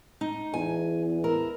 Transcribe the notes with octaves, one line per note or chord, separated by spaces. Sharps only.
D#4
E2 G#5
E4 A#4